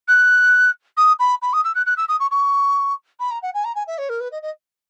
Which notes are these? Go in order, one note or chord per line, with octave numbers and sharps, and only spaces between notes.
F#6
D#6
B5
B5
D#6
E6
F#6
F#6
E6
D#6
C#6
C#6
B5
A#5
F#5
G#5
A#5
G#5
E5
C#5
A#4
B4
D#5
D#5